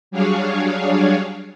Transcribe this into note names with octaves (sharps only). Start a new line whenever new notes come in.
F#3 G3 D4 G#4 C#5 F5